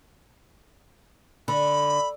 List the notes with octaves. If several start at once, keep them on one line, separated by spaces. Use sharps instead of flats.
D3 B5